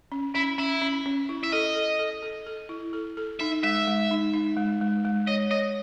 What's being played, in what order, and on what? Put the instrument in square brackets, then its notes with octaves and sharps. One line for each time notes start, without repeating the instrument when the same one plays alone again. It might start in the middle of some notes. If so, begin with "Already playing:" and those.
[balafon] C#4
[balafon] C#4 [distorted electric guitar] E4
[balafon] C#4 [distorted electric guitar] E4
[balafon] C#4
C#4
E4
[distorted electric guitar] E5
[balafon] A4 [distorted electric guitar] D#5
[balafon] A4
A4
A4
A4
E4
A4
A4
[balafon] D#4 [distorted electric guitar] E5
[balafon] G#3 [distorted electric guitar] E5
[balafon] G#3
D#4
D#4
G#3
G#3
G#3
[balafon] C#5 [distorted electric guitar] D#5
[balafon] C#5 [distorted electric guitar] D#5